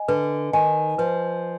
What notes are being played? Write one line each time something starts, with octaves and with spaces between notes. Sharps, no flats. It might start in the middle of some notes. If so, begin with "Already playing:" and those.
Already playing: D#5 G#5
D3 B4
D#3 D#5 G#5
F3 B4